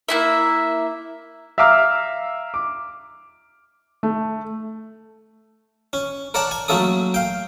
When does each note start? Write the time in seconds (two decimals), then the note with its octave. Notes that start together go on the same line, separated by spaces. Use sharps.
0.09 A#3 E4 E5
1.58 E5 F5 A#5 D6 E6 F6
2.54 D6
4.03 A3
5.93 C#4
6.34 A#4 C#5 D5 F#5 A5
6.51 G#5
6.68 F#3 A3 A#3 C#4 A4 D#6
7.14 F5 G5